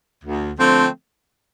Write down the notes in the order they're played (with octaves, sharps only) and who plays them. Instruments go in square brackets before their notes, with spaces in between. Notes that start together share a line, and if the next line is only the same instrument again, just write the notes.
[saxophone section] D2
D3 F3 A3 C4